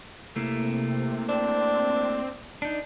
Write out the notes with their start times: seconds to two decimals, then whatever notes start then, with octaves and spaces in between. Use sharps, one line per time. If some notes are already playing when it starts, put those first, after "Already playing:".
0.36 C3 A3 A#3 E4
1.29 C4 D4
2.62 D4 D#4